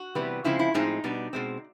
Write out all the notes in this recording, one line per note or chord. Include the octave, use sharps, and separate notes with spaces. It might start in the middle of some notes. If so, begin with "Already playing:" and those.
Already playing: F#4
C3 E3 G3 B3
C#3 F3 G#3 C4 E4
E4
A2 F3 G#3 C4 D#4
B2 G3 B3 D4
B2 G#3 C4